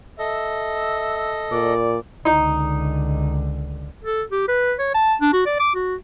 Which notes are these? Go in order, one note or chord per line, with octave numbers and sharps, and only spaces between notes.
A4 D#5 E5
A#2 D5
C#2 D3 D#4
A4
G4
B4
C#5
A5
D4
F#4
D5
D6
F#4